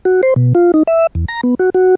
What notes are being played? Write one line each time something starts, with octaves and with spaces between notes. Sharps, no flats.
F#4
C5
B2
F4
D#4
E5
E2
A#5
B3
F#4
F#4